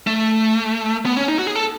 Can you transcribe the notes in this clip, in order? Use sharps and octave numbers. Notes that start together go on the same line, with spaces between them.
A3
B3
C#4
D#4
F#4
G#4
A4